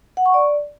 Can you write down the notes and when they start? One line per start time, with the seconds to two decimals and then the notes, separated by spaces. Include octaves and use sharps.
0.17 F#5
0.26 C#6
0.34 D5